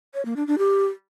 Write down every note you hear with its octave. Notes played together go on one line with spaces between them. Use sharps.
C#5
A#3
D4
D4
G4